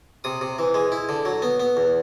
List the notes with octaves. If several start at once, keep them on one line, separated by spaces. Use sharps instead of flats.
C3 D#6
C3
E3
G#3
E4
D3
F#3
B3
B3
E2